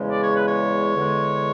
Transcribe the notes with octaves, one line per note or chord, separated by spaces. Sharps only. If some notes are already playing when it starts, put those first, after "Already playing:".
Already playing: E2 C#3 G#3
D5
C#5
B4
C#5
E2 D3 G#3